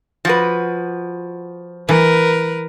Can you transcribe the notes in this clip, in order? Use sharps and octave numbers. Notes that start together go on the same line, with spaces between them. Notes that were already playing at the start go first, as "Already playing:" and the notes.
F3 F#4 B4
E3 A#4 B4